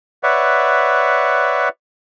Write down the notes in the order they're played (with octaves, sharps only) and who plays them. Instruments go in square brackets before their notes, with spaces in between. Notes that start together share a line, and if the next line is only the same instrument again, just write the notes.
[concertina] B4 C#5 D5 E5 F#5